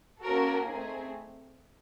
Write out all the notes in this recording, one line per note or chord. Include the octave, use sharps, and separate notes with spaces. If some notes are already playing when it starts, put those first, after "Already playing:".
A#3 C#4 F#4 A4 A#4
A3 C4 D#4 G#4